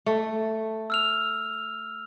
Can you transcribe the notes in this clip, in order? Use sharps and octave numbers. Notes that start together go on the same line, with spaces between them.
A3
E6 F6 F7